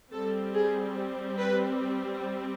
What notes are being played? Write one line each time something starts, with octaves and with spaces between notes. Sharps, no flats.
G3 C4 A4
G#4
B4